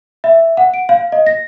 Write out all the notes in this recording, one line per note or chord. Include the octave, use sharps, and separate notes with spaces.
E5
F#5
D7
F5
D#5
A#6